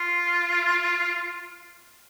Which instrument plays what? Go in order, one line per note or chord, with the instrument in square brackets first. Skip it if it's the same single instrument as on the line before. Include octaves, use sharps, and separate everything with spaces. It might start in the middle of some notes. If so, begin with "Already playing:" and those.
Already playing: [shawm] F4